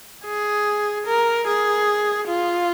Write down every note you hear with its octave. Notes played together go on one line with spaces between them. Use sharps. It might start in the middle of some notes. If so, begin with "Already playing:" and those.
G#4
A#4
G#4
F4